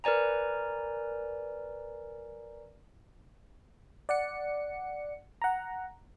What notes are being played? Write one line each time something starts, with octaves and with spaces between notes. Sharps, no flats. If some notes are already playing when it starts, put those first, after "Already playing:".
A#4 B4 D5 G#5 A#5
D5 F#5 C#7
F#5 A#5